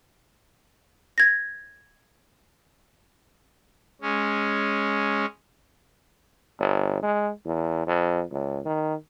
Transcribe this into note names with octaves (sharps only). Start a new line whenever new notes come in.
G#6 A#6
G#3 C#4
G1
G#3
E2
F2
C#2
D#3